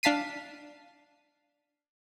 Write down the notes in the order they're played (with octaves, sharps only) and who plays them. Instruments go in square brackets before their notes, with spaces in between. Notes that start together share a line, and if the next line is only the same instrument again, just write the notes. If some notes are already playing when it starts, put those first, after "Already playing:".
[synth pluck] D4 F5 A5 B6 C7 D#7